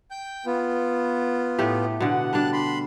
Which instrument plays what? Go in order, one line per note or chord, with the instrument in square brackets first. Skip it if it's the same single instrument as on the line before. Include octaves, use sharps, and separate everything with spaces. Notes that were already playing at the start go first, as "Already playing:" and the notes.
[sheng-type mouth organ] G5 G6
B3 F4
[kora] A2 A3 G4
[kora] B2 D3 [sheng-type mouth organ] F#5
[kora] G3 D4 [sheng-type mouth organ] A5 F#6
[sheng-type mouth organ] B5 C6